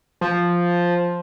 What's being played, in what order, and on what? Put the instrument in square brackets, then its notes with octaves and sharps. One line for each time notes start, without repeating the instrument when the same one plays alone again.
[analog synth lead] F3